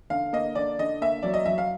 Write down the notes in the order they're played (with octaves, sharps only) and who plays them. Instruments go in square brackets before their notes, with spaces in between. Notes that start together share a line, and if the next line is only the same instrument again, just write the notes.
[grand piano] D3 F5
A#3 D#5
D3 D5
D3 D#5
A#3 E5
F#3 D5
D#5
F#3 E5
F5